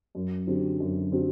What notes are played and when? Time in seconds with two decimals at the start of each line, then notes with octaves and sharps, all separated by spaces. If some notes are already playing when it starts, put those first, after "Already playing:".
0.15 F#2
0.47 D3 F#3 C4 G4
0.80 F#2
1.12 D3 F#3 C4 G4